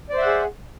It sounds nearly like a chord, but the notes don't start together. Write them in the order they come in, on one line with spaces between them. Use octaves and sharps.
D5 C5 E5 F#5 G#4